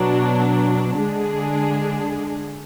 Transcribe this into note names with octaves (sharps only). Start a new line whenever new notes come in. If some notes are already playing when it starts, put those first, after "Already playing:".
Already playing: B2 F#3 D4
D3 G#3 D4 G#4